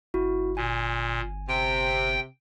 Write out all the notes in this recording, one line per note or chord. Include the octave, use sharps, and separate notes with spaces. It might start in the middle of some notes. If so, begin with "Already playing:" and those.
G1 E4 F#4
A#2 G#5
C3 G5